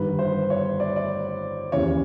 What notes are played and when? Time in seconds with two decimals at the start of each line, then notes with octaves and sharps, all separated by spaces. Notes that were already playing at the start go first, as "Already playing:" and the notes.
Already playing: G1 G2 D#3 B4
0.19 C5
0.50 C#5
0.80 D5
0.96 D5
1.72 D#2 C#3 E3 C#5